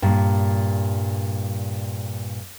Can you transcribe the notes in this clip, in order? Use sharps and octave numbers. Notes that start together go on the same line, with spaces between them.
G2 A#2